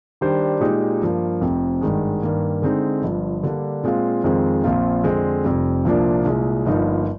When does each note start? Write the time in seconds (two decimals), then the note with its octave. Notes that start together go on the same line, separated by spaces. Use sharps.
0.21 D#3 G3 D4 G4 C5
0.61 A#2 G#3 D#4 G4
1.02 G2 F3 A#3
1.41 F1 F2 C3
1.81 G#1 G2 D#3 G#3
2.22 G2 D#3 A#3
2.62 D3 G#3 C4 D#4
3.03 G1 G2 F3
3.43 D3 G3 A#3 D4
3.84 A#2 G#3 C4 F4
4.24 F2 D#3 G#3 C4 F4
4.64 A#1 A#2 F3 C4 F4
5.04 F2 D3 G#3 C4
5.44 F1 F2 C3 G3
5.85 C2 A#2 F3 A#3 D4
6.25 C2 A#2 G#3
6.65 G1 G2 F3 A#3 D#4